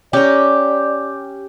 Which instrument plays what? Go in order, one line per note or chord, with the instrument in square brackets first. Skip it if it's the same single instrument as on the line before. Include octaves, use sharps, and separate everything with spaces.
[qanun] C#4 A#5 [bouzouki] G4 [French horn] D5